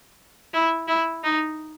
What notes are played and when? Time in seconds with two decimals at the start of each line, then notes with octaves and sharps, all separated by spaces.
0.54 E4
0.88 E4
1.24 D#4